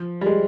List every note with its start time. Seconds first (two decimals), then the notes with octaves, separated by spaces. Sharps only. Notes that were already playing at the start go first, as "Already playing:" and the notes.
Already playing: F3
0.21 G3
0.26 G#3